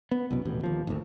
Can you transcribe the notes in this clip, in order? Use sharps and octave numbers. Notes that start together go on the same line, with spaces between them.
B3
C2 F#2 B2
D#1 A1 G2 B2
D#2 F3
G#1 D2